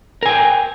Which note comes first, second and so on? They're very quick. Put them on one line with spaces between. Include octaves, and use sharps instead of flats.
A#4 G#5 G5